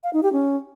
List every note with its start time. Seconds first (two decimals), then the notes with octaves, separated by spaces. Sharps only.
0.04 F5
0.13 D#4
0.23 G4
0.33 C#4